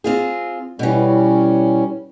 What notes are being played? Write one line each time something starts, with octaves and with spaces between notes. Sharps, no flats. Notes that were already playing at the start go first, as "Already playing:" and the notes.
C4 F4 G#4
B2 E3 G3 C#4